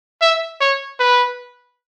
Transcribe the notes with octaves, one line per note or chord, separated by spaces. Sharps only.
E5
C#5
B4